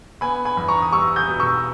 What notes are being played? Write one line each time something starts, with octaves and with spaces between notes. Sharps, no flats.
B3 G#5 B5
G#5 B5
E2
A#5 C#6
D#6
G3 C#6 E6
D#6 G6
B2
C#6 E6